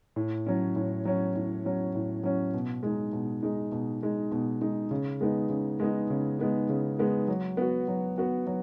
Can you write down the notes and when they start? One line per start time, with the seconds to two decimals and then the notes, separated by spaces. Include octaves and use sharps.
0.16 A2
0.47 F#3 C#4
0.76 A2
1.05 F#3 C#4
1.36 A2
1.65 F#3 C#4
1.95 A2
2.23 F#3 C#4
2.54 B2
2.83 G#3 D#4
3.13 B2
3.43 G#3 D#4
3.72 B2
4.02 G#3 D#4
4.31 B2
4.61 G#3 D#4
4.91 C#3
5.21 G#3 B3 D#4
5.50 C#3
5.80 G#3 B3 D#4
6.10 C#3
6.39 G#3 B3 D#4
6.69 C#3
6.99 G#3 B3 D#4
7.28 F#3
7.57 B3 F#4
7.88 F#3
8.18 B3 F#4
8.47 F#3